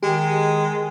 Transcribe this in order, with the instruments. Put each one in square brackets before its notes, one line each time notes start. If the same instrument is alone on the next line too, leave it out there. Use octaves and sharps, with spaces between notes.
[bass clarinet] D#3 [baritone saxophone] G#3 [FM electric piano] G4